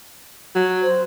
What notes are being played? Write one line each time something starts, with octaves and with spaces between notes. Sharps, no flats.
F#3
C5